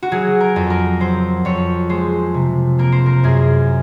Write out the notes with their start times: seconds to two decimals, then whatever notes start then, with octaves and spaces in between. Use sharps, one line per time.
0.02 F#4
0.12 F#3 G#4
0.41 A#4
0.56 F2
0.70 A#4
1.00 F#3 C5
1.45 F2 C#5
1.89 G#3 C5
2.34 C3
2.78 A#3 A#4
2.92 C5
3.06 A#4
3.24 F#2 G#4